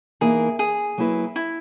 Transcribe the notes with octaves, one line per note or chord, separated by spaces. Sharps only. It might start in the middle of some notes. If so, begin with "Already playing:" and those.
E3 A#3 D#4 G#4 A#4
G#4
F#3 A#3 E4 B4
E4